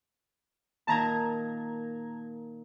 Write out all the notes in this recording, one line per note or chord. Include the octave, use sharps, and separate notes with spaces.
A#2 D#3 A5 A#5 G#6